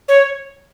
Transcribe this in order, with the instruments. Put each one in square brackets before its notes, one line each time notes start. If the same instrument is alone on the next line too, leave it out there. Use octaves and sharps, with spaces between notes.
[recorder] C#5